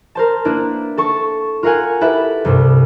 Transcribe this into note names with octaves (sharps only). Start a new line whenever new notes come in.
A#4 C5 A5
A#3 D4 E4 B4
A4 A5 C#6
F4 A#4 F5 F#5 G#5
E4 G4 A4 B4 E5
C2 G2 C3